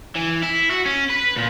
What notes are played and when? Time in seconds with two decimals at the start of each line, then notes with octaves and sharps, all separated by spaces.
0.16 E3
0.43 E4
0.71 F#4
0.86 C#4
1.09 B4
1.36 A#2